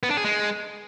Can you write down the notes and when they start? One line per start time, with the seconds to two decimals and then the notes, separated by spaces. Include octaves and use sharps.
0.03 B3
0.10 D4
0.17 G#4
0.24 G#3